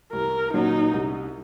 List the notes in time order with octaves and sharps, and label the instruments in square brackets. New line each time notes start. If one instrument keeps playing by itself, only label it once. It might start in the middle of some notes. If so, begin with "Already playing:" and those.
[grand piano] C2 [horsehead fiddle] A#4
[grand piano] A#2 F#3 C#4 F#4 [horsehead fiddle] D#4
[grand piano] C2